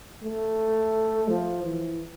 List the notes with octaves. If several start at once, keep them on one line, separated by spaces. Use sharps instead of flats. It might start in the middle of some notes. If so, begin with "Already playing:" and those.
A3
F3
E3